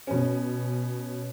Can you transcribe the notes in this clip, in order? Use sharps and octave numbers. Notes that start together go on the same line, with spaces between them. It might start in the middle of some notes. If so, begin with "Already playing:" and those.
B2 C#4